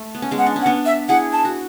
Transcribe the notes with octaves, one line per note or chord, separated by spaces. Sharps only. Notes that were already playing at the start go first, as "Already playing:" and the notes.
Already playing: A3
B3
C#4
G#3 B3
F#5
D4
C#4
F#5
B3 D4
E5
E4 G#4 F#5
A5
F#4